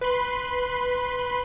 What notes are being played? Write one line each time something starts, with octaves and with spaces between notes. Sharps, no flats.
B4 B5 C6